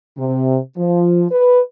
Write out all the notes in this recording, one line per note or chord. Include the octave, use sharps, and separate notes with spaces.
C3
F3
B4